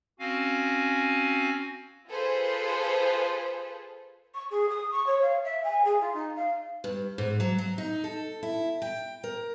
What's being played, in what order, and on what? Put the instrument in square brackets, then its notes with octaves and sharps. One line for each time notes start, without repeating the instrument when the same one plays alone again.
[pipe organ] C4 C#4 F#4 F5 G#5
[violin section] F4 G#4 A4 B4 C5
[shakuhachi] C#6
G#4
D#6
C#6
C#5
F5
E5
G#5
G#4
F4
D#4
F5
[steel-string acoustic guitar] G2
G#2
F#3
F#3
D#4
A4
E4
G5
A#4